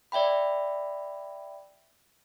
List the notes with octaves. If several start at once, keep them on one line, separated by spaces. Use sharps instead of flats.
D5 E5 G5 B5